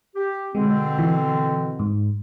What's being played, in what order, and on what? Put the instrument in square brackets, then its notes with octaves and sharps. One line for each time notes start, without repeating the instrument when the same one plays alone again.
[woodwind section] G4
[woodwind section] B2 D3 C4 [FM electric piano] G#3
[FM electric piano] E3
G#2